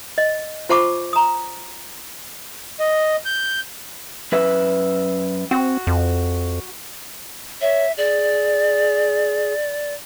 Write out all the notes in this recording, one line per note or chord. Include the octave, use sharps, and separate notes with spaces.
D#5
F4 C5 F#5 A5 C#6 D6
A#5 D#6
D#5
G6
F#2 B4 E5
C4 F#4
F2
C#5 E5
G#4 D5